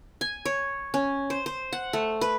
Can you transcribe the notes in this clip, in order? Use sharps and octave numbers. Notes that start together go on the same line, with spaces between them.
G#5
C#5
C#4
C5
C5
F#5
A3
B4